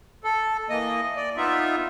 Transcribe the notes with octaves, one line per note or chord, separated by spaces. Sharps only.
A4
E3 A#3 D#5
D5
B3 D#4 F4 E5